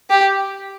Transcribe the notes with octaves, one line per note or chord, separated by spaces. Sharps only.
G4